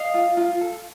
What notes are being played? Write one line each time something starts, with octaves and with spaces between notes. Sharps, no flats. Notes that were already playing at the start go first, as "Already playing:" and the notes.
Already playing: D#5 F5
F4
F4
A4